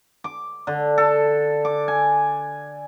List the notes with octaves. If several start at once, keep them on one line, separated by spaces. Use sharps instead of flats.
D6
D3
A4
D6
G#5